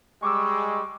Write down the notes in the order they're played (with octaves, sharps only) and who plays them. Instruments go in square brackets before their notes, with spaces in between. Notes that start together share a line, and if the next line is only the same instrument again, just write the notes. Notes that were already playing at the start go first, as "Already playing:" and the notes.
[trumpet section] G3 G#3 [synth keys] C#6 D6 E6